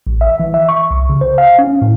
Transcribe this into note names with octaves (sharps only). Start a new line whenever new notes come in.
A1
E5
E3
E5
C#6
C2
C#3
C5
F5
C#4
A2